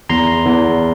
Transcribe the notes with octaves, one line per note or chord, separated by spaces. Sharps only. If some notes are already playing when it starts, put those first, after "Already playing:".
E2 A#5 C6
E2